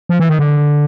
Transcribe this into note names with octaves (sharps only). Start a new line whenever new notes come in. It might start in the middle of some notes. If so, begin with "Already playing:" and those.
F3
E3
D#3
D3